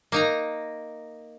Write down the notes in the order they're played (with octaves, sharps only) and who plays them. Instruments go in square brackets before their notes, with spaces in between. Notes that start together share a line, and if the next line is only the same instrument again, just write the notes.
[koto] A#3 D#4 A#5